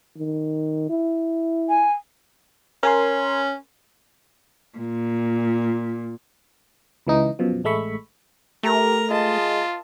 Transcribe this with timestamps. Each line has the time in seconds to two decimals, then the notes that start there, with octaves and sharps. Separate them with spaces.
0.18 D#3
0.89 E4
1.69 G#5
2.83 C#4 A#4 G#5 C6
4.78 A#2
7.07 C#2 E3 D#4
7.39 F#2 B2 F3
7.64 A1 G#3 A3 E5 B5 C#6
8.63 A3 G4 A#4 A#5
9.10 G#3 F4 D#5 A5